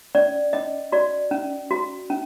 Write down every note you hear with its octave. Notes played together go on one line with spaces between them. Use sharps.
C#4 D5
C#4 D#5
F#4 D5
C#4
F#4
C#4